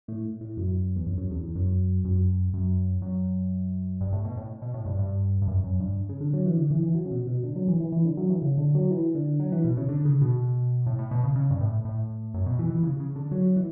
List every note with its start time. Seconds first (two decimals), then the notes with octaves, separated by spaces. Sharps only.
0.08 A2
0.41 A2
0.57 F#2
0.96 E2
1.07 F#2
1.18 F#2
1.31 E2
1.43 E2
1.55 F#2
2.05 F#2
2.53 F#2
3.02 F#2
4.01 G2
4.13 A2
4.25 B2
4.37 A2
4.62 B2
4.74 A2
4.86 G2
4.99 G2
5.42 G2
5.48 F#2
5.64 F#2
5.80 G2
6.09 C#3
6.21 D3
6.34 F#3
6.46 E3
6.58 D3
6.70 E3
6.83 E3
6.95 F#3
7.06 C#3
7.11 B2
7.27 B2
7.43 D3
7.56 F#3
7.68 E3
7.80 E3
7.92 E3
8.05 D3
8.17 F#3
8.30 E3
8.42 C#3
8.58 D3
8.75 F#3
8.91 E3
9.15 D3
9.40 F#3
9.52 E3
9.64 B2
9.77 C#3
9.89 D3
10.05 C#3
10.21 B2
10.87 A2
10.99 A2
11.11 B2
11.24 C#3
11.35 C#3
11.51 G2
11.61 A2
11.85 A2
12.34 F#2
12.46 B2
12.59 E3
12.70 E3
12.83 C#3
13.00 C#3
13.16 D3
13.31 F#3
13.56 E3